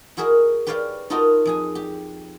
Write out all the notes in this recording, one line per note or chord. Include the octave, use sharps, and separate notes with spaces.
E4 F#4 G#4 A#4 E5
G4 B4 C#5 D5 F5 G5
D#4 F4 F#4 A4 A#4 D#5
F2 G#4 G#5
G4